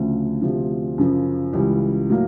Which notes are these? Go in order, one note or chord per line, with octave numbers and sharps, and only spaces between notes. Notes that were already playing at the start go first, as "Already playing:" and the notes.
Already playing: D2 C#3 F3 A3
D2 C3 F3
F#2 C#3 F3
C#2 C#3 E3 G3
A2 F#3 A#3